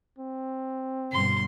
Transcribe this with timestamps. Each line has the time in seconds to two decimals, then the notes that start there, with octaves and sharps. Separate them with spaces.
0.18 C4
1.12 G1 B2 G3 C6